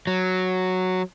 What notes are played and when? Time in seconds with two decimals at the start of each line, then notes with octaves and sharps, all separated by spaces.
0.07 F#3